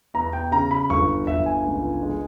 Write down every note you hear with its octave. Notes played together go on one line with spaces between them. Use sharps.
E2 A#5
G5
C#3 A#5
B5
G1 C#6
G1 E5
G#5
C#2
G#3